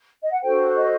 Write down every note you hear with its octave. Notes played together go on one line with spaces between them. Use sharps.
D#5
F#5
D4 F#4 A4 C5 G5
D#5